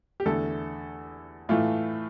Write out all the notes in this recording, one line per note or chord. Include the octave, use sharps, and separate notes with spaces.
G4
E2 D3 A3 A4
A2 E3 A3 F4